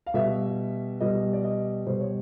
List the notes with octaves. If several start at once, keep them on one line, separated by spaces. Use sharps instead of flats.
F5
B2 G3 E5
B2 G3 D#5
D5
D#5
B2 G3 C5
C#5